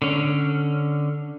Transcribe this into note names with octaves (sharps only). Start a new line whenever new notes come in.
D3 C#4